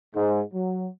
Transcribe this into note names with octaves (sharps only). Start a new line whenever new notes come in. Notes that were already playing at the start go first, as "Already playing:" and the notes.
G#2
F#3